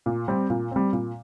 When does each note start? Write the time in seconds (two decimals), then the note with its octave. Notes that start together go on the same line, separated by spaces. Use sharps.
0.06 A#2
0.28 G3 C4
0.50 A#2
0.71 G3 C4
0.93 A#2